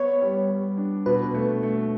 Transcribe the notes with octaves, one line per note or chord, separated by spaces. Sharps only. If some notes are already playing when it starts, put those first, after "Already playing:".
Already playing: B3 C#5
G3
G3
D4
B2 B4
A3
A3